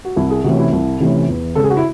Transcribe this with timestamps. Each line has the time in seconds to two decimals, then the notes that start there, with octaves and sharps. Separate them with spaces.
0.04 F#4
0.16 C2 E4
0.30 G#4
0.44 C3 E3 A3 C#4 F#4
0.59 E4
0.73 C2
1.00 C3 E3 A3 C#4
1.29 E2
1.55 C#3 G#3 A4
1.63 G#4
1.70 F#4
1.77 E4